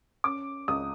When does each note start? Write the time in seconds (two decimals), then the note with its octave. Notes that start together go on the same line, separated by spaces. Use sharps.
0.24 C#4 D6
0.68 C#2 D#6